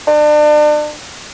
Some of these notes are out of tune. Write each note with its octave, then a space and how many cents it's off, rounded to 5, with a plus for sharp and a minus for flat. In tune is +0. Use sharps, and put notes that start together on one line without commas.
D4 +35